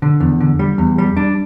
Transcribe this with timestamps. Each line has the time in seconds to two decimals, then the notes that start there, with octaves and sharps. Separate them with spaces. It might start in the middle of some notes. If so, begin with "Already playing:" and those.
0.02 D3
0.20 E2
0.40 D3
0.59 G3
0.78 E2
0.98 G3
1.17 D4